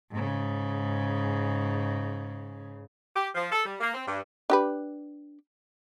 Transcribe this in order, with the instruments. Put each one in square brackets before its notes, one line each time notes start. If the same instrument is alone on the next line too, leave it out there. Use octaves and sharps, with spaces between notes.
[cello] G#2 C#3
[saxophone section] G4
F3
A4
G3
A#3
C4
G2
[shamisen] D4 G4 B4